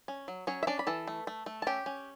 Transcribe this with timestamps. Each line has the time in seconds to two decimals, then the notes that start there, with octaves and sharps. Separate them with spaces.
0.08 C#4
0.28 F#3
0.47 F#3 C#4 C#5
0.63 E5
0.67 C#4 D4 D5
0.79 B5
0.87 E3 A4 A5
1.07 A3
1.27 A3
1.46 A3
1.62 A5
1.67 C#4 G4 G5
1.86 C#4